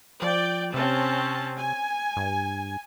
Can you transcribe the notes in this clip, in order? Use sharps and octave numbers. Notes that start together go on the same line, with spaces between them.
F3 D5 G5
C3 C4 C#4 A5
G#5
G2